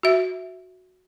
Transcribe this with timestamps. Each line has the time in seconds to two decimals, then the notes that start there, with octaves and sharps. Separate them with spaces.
0.03 F#4 E5